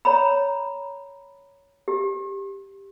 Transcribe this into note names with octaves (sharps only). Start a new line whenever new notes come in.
C#5 A#5 B5
G4